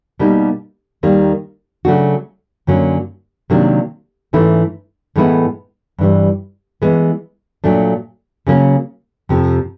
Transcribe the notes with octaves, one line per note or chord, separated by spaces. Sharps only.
B2 G3 A#3 D#4
D#2 D#3 G3 A#3
C#3 F#3 A3 D4 F#4
F#2 D3 F#3 A#3 C#4
C3 D#3 F#3 A#3 D4
G#2 E3 A3 C#4 E4
A2 E3 G#3 B3 E4
G2 E3 G3
E3 G#3 B3
A#2 F#3 A3 D4
C#3 F#3 A#3 C#4
F2 C3 F3